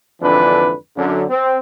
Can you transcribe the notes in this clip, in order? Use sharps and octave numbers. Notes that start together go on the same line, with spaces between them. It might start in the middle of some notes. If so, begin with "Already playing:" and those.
F2 G#2 D3 E3 D4 B4
F#2 D3
C4